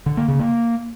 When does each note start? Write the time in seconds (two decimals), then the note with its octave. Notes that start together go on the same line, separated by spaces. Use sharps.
0.06 D3
0.17 A#3
0.28 C#3
0.39 A#3